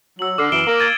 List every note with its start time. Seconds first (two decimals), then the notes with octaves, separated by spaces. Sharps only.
0.19 F#3 E6 F#7
0.38 D3 D6 F6 C7
0.52 F#2 E3 D7 E7 G7
0.67 A#3 D6 F#7
0.79 G#6 A6 D#7